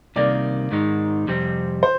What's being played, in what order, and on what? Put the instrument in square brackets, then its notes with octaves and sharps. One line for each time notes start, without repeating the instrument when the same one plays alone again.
[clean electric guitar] C2 C3 D#3 A#3 [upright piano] D5
[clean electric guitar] G#2 D#3 G#3 D#4
F2 C3 G3 C4
[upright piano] C5